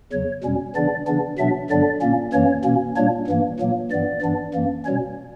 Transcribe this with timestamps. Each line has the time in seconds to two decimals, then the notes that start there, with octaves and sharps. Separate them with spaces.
0.12 E2 C#3 F#3 C#5
0.44 E2 B2 G3 C#4
0.75 C#3 E3 B3 D4 D5
1.07 C#3 E3 B3 D4
1.38 B2 F#3 B3 D4 E5
1.70 G2 D3 F#3 B3 D4 D5
2.02 A#2 A#3 C#4
2.33 F#2 E3 A#3 C#4 C#5
2.64 B2 A#3 C#4
2.96 A#2 G3 A#3 D4 C#5
3.27 G2 E3 A#3
3.59 A#2 F#3 A#3
3.91 G2 E3 B3 D5
4.22 G2 E3 B3 D4
4.54 F#2 E3 A#3
4.85 B2 G3 C#4 C#5